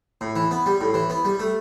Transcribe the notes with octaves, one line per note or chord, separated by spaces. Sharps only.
A2
E3
B3
G3
A2
E3
B3
G3
A3